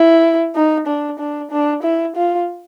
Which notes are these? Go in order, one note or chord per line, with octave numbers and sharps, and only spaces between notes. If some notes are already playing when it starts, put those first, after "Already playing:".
Already playing: E4
D#4
D4
D4
D4
E4
F4